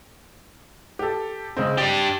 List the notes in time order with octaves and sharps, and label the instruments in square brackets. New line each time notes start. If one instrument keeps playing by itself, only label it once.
[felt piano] G4 A4
C#3 G#3 C4
[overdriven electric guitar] D4 G4 [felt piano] A6